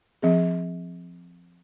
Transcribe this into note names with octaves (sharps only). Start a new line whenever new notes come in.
F3 C4 G#4